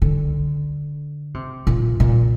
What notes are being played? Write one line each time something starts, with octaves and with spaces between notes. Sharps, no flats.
D3
C3
A#2
A#2